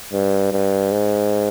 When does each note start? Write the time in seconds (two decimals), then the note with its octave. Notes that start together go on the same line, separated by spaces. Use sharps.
0.13 G2
0.53 G2
0.92 G#2